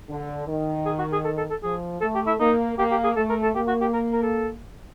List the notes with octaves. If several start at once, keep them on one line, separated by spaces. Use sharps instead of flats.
D3
D#3
G#4
F#4
G#4
A4
A4
A4
F3 G#4
A3 A4
G4
E4
A#3 D#4
A#3 G4
G4
G#4
A3 A4
A#4
A4
A#3 G4
F#4
G4
A#4
A#4
A4